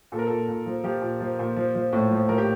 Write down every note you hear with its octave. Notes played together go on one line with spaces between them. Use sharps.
A#2 A4
A#4
A#2 A4
A#2
F3
F3 G4
A#2
F3
A#2
F3
F3
A2
F3
F3 A#4
G4